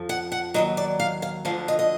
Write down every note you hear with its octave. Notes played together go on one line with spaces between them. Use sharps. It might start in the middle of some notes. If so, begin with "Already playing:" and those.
Already playing: F2 F3
F#5
F#5
D#2 D#3 F#3 D#5
D5
F5
F5
D2 D3 F3 F5
D#5
D#5